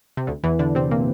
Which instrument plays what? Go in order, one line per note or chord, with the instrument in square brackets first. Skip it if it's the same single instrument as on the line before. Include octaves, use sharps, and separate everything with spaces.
[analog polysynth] C3
D2 D3
E2 E3
D3 D4
C3 C4
A#2 A#3